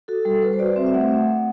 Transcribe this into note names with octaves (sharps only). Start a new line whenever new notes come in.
F#4 A4
G3 A4
G3 B4
C5
F#4 D5
C4 E5
E5
A3 F#5